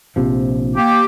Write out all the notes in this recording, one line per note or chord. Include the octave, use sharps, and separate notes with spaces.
A#1 C3 F3
A#3 G4